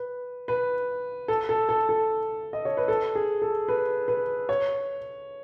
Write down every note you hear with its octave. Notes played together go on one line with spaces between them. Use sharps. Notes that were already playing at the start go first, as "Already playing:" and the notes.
Already playing: B4
B4
A4
A4
A4
A4
D#5
C#5
B4
A4
G#4
A4
B4
B4
C#5